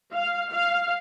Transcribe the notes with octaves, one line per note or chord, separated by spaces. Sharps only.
F5
F5